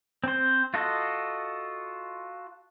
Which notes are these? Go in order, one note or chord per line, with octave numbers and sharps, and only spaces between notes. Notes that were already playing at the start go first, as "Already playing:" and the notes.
C4 C5
F4 F#4 A4 D#5